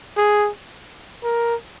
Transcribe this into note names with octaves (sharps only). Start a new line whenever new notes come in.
G#4
A#4